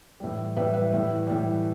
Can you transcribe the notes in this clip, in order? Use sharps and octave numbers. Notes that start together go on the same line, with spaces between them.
A2 E3 G3
A2 E3 G3 B4 E5
B4 E5
A2 E3 G3
A2 E3 G3